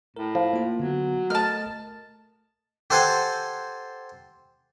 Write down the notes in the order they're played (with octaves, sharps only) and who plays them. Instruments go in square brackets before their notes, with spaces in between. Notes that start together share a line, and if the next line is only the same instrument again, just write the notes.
[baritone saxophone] A2 [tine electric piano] A#4
[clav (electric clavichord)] F3
[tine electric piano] A#3 F4
[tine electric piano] D3 B3 [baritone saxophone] F#3
[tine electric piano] A3 A#4 D#5 [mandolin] A5 F6
[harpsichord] G4 A4 C5 F#5 G#5